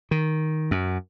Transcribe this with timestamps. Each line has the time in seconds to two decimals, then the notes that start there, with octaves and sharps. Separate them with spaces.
0.11 D#3
0.71 F#2